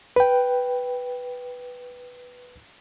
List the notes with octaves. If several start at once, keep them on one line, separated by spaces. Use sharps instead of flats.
B4 G5